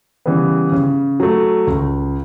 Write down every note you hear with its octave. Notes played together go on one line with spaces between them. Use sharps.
C#3 E3 G3 B3
C#3
F#3 A3
C#2